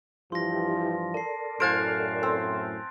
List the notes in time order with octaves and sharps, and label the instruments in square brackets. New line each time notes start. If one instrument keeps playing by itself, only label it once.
[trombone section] G2 E3 F3 [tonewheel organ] E4 F4 G4 [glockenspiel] C6 A#6
[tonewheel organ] A4 A#4 D5 [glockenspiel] A5 C7
[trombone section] F#2 A2 [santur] C5 F5 G#5 [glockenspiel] F#6 A6 D7
[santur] C4